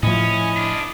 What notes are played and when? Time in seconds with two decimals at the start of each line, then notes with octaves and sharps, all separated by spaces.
0.03 A2 F3 C#4 E4 D#5
0.56 D4 F4